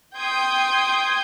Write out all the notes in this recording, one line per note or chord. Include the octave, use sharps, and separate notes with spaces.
G5 C6 D#6 G6 G#6